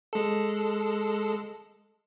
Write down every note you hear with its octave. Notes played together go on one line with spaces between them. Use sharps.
G#3 A4